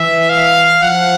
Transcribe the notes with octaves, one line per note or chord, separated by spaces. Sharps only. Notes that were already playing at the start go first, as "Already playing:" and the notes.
Already playing: E3 E5
F5
F3 F#5